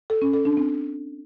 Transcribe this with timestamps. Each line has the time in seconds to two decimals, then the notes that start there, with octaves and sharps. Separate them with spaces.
0.10 A4
0.22 C#4
0.33 A4
0.45 D4
0.57 C4